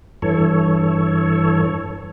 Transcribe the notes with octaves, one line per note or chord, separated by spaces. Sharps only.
G2 E3 A4 C#5